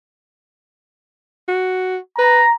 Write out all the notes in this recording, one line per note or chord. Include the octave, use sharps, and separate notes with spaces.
F#4
B4 A#5